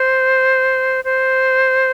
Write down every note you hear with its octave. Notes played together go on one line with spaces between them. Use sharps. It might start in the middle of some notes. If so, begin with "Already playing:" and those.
Already playing: C5
C5